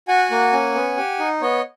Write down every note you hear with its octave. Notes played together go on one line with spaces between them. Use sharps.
F#4 F#5 G#5
A#3
C#4
B3
G4
D#4
B3 C#5 D#5